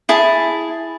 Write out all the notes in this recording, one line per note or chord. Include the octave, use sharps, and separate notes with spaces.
E4 G#4 A5